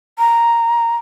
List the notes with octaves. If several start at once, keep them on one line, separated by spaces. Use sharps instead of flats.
A#5